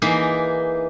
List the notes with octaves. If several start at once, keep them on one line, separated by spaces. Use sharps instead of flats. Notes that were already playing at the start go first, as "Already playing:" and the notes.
E3 A#3 D#4 G#4